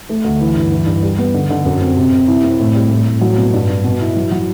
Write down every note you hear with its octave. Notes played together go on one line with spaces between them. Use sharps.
A3
D2
E3
G2
E3
G2
G3
B3
D3
D3
F#2
C4
C3
C3
E4
C4
A2
G3
A2
A2
F#3
B2
G2
D4
B2
E4
F#3
F#3